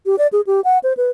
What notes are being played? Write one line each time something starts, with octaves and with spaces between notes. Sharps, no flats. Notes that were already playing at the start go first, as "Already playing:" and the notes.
G4
D5
G#4
G4
F#5
C5
B4